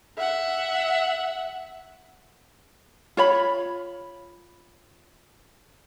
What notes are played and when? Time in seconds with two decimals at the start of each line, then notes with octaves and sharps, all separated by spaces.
0.18 E5 F#5
3.17 F4 C#5 B5